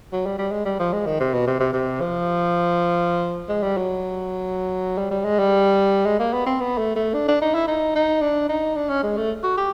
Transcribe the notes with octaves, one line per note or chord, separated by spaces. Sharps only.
F#3
G3
G3
G#3
G3
F3
G#3
D#3
C3
B2
C3
C3
C3
F3
G#3
G3
F#3
G3
G3
G#3
G3
G#3
A#3
B3
C4
B3
A3
A3
D4
D4
D#4
E4
D#4
D#4
D4
D#4
D4
C#4
G#3
A3
F#4
G4